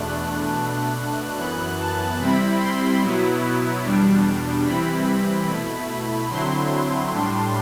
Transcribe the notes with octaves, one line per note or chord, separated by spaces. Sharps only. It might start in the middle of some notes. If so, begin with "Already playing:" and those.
Already playing: E2 B2 A3 D4 F#6
B2 A3 D4
F#2 E3 B3 F#6
A5
C3 G3 C4 E4 B5
C6
B2 F#3 B3 E4
E2 B2 G3 D4
C3 E3 G3 C4 E4 B5
B2 A3 E4
D3 F#3 C4 E4 C6
A2 G3 D4